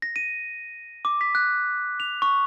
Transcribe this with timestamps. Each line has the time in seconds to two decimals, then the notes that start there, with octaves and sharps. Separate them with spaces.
0.02 A#6
0.16 D#7
1.05 D6
1.21 B6
1.35 F#6
2.00 F7
2.22 C#6